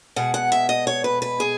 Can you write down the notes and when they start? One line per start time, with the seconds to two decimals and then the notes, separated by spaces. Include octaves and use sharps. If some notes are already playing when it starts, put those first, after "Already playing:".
0.16 B2 G#3 F#5
0.34 F#5
0.52 E5
0.69 D#5
0.87 C#5
1.04 B4
1.22 B4
1.40 G#4